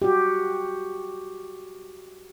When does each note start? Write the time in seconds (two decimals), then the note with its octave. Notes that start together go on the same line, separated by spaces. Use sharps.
0.02 F#4 G4